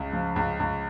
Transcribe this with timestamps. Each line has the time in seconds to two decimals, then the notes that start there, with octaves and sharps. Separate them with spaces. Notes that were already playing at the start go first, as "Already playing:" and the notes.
Already playing: C#2 C#3
0.13 F3
0.36 C#2
0.60 C#2